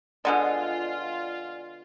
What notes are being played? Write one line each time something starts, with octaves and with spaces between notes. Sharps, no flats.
B2 D3 G#3 F4 D5 F#5 G#5